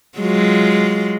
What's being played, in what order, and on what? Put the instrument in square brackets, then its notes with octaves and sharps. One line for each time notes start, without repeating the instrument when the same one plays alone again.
[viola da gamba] F#3 G#3 F4